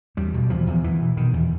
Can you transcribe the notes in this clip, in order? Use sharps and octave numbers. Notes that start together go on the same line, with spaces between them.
E2 G3
B2
E2 F3
E2
E2 E3
B2
B2 D#3
E2